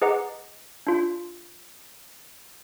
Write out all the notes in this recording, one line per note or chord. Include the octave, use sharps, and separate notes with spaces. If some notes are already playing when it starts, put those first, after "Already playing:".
G#4 B4 D#5 F#5 A#5 D6
D4 F4